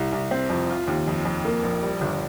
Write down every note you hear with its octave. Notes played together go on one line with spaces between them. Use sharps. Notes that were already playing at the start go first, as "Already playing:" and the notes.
Already playing: C2
C2
C4
F2
F4
D#2
F2
F2
A#3
A#1
G3
G1